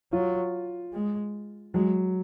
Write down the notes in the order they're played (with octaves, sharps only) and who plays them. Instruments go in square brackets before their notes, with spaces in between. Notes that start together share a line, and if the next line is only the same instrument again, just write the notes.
[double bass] F#3 [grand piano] F4
[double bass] G#3
[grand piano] F#3 [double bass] G#3